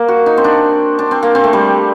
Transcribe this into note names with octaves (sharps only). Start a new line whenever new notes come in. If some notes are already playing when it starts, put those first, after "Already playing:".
Already playing: A#3
F#4
D#4
C4
D4
D4
C4
A#3
C4
A3
G3